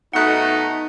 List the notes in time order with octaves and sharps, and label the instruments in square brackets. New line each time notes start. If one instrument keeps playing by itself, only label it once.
[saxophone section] B2 A3 [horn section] D#4 [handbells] F#5 F#6